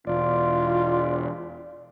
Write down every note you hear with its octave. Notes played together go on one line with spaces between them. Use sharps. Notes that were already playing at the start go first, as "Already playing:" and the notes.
E1 F4 D5